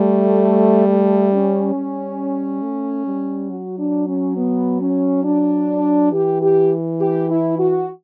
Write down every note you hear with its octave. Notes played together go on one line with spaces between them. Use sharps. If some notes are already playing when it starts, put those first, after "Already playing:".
Already playing: G3 A3
A3
C#4
G3
A3
G3
F#3 F#4
D4
C#4
B3
C#4
D4
E3 G4
G4
G4
E4
F#4